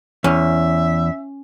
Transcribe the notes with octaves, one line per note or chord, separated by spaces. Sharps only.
E2 C#4 E5